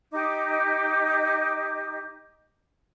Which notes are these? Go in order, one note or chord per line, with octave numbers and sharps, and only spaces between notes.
D#4 G4 D#5 D6